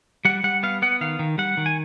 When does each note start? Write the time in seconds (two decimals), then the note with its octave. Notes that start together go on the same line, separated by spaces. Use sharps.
0.25 G3 F#5
0.44 G3 F#5
0.63 B3 F5
0.82 B3 F#5
1.01 D#3 F5
1.19 D#3
1.38 G3 F#5
1.57 D#3
1.66 G#5